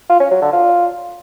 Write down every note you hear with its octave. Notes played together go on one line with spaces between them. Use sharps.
F4
C#4
F#3
D3
F4